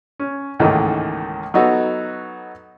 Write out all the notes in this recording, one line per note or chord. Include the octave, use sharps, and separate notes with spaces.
C#4
C#2 G#2 D#3 E3 A3 A#3
F#3 B3 D#4 F#4 A4